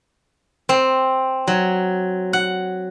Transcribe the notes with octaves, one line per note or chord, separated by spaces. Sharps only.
C4
F#3
F#5